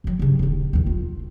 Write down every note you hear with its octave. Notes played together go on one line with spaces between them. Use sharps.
F#2 F#3
G2 C#3
D#1 D#2
E1 D#2
F4